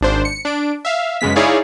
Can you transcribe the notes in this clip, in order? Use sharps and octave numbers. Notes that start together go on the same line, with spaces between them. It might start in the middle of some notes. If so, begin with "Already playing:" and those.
G#1 D4 C5
C#7
D4 D7
E5 F5
F#2 C#3 G#3 B3 B6
D#4 E4 G#4 C#5 D5 F5